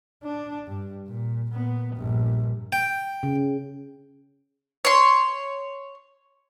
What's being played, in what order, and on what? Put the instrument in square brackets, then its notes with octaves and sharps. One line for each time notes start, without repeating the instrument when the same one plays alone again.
[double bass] D4
G2
A#2
A#2 B3
A#1 G2
[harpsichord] G5
[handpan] C#3
[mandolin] C#5 C6